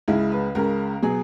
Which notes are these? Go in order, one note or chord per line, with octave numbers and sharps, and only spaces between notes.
C#2 C#3 G#3 E4
B4
C#2 C#3 G#3 A#4
B2 F#3 G#4